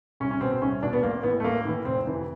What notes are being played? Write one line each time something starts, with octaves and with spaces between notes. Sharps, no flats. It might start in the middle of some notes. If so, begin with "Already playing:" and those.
C2 C#4
C#4
B2 C4
C4
C2 C#4
B2 D4
B3
A1 A#3
A2 E3 B3
A3
A1 A#3
A2 E3
F1 C4
F2 C3 E3